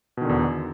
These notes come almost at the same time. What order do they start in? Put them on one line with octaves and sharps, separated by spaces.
B2 D#3 D3 E2